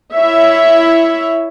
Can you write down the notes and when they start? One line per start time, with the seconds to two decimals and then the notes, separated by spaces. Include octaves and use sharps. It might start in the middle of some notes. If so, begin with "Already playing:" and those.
0.14 E4 C#5 E5